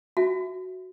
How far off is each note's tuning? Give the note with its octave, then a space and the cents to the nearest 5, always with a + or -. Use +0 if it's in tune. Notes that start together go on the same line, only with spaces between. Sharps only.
F#4 +0 E5 +0